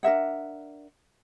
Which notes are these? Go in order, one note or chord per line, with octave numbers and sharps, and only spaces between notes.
D4 A#4 E5 F#5